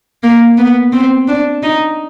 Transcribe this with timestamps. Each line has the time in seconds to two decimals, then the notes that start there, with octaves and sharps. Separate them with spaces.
0.23 A#3
0.58 B3
0.93 C4
1.28 D4
1.63 D#4